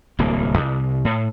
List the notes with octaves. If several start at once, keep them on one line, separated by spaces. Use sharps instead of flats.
D1 C2 A#3
C2
A2